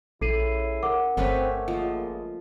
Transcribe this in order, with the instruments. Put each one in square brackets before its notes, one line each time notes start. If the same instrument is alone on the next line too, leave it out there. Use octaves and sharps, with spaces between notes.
[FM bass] A#1 [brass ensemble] C#3 C#4 E4 [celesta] A4 C7 D#7
[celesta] A#4 F#5 D6
[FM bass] G1 [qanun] A3 C#4 B4 [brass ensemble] C4
[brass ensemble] C#2 A#3 D#5 [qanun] F3